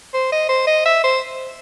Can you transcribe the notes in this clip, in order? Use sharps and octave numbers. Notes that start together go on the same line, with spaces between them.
C5
D#5
C5
D#5
E5
C5